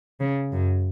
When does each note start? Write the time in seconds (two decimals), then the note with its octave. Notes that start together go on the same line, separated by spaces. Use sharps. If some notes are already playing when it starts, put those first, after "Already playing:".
0.20 C#3
0.52 F#2